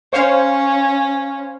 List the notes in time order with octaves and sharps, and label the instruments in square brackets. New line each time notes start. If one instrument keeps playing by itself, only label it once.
[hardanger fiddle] C#4 [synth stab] C5 C#5 F5